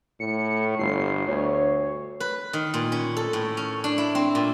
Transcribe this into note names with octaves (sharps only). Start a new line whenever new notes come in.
A2 C#7
G1 C7
D2 C#5
B4
D#3
A#2
C#4
A4
A2
C#4
D4
E4
C4
A#2